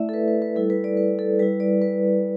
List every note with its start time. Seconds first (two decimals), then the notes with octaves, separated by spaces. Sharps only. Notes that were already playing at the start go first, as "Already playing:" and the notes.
Already playing: A3 E4 D5 E5
0.09 A4
0.14 B4
0.28 B4
0.42 B4
0.56 G3 E4 A4
0.70 B4
0.84 D5
0.97 B4
1.19 A4
1.39 G3 E4 B4
1.60 D5
1.82 B4